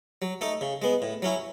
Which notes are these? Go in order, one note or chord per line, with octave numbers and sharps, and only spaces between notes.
F#3
A3 D#4 A4
C#3
G#3 B3
A2
F#3 C#4 E4